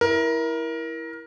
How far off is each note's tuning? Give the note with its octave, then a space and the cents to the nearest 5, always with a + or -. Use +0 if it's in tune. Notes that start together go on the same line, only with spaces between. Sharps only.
E4 -5 A#4 +20